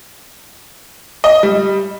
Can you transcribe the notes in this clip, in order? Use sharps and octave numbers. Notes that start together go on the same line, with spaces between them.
D#5
G3